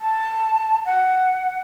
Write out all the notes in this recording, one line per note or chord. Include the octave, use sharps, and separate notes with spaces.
A5
F#5